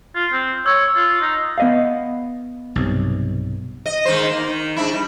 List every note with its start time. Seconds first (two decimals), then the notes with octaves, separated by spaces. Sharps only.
0.15 F4
0.33 C4
0.66 C#5 E6
0.95 F4
1.21 D#4
1.58 B3 D#5 F5
2.75 B1 G2 C3
3.86 D#5
4.05 G#2 D#3 C5
4.31 A#3
4.48 D#3
4.77 G#2 D4 E4
4.93 G3